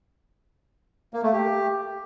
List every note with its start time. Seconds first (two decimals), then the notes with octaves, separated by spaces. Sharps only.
1.14 A#3
1.23 A3
1.33 G4